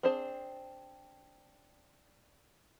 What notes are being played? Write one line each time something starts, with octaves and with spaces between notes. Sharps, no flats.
C4 D4 G#4 C5 A5